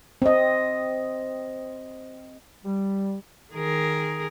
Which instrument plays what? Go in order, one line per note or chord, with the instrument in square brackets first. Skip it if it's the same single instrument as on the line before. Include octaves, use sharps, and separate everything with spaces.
[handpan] C4 D#5
[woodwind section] G3
[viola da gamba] D#3 G#4 A#4